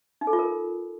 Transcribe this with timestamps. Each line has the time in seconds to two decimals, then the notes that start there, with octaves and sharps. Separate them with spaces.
0.21 D#4
0.27 A4
0.33 F4
0.39 A#4